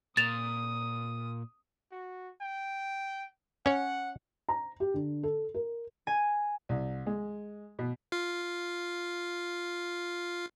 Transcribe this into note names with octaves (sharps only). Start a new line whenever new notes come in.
A#2 D#6 A6 E7 F7
F#4
G5
C#4 C#5 F#5
A#5
G4
D3
A4
A#4
G#5
C2
G#3
B2
F4 F5